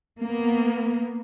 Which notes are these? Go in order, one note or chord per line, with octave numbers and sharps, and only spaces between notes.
A#3 B3